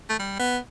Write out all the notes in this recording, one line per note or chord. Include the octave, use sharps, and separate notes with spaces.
A3
G3
B3